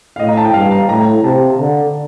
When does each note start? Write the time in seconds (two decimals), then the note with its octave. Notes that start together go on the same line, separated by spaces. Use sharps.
0.16 F5
0.19 A2 D#5
0.29 A#5
0.37 A5
0.45 G5
0.54 G2 F5
0.71 A#5
0.89 A2 A#5
1.24 C3 A5
1.58 D3